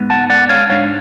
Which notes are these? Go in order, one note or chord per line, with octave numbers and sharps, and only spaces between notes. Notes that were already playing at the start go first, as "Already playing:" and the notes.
Already playing: G#2 G#3 B3
F#5 A5
D5 F#5
C#5 F5
G#2 G#3 D4 C#5 F5